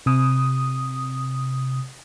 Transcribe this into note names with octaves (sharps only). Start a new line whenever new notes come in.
C3 D#6